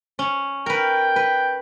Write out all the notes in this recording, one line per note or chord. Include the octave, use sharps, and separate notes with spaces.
C#4
A#4 B4 G5
B4